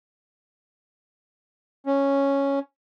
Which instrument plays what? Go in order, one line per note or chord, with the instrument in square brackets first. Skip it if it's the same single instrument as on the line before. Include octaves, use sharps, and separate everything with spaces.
[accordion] C#4